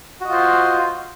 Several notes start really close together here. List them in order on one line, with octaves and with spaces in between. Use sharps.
F#4 D#5 F4 C5